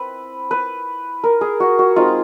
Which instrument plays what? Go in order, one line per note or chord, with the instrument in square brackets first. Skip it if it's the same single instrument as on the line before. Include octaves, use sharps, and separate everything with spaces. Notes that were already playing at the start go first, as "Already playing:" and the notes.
Already playing: [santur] C4 E4 B4
B4
A#4
G#4
F#4
F#4
G#3 C4 D#4 F4